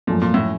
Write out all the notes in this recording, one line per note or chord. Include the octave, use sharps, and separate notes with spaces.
F#2 A#2 F3 A3
A#2
A2